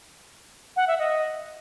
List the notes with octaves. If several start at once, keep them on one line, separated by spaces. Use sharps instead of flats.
F#5
E5
D#5